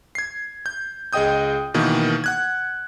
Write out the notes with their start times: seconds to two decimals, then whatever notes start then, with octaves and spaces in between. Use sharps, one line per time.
0.15 G#6 C7
0.66 G6
1.13 C#2 G#4 D#5 G5 D#6 G6
1.74 B2 D#3 E3 A#3
2.24 F#5 F#6 G#6